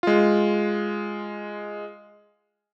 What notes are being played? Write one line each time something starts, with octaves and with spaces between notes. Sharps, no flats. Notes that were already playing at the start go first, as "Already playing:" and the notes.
G#3 F4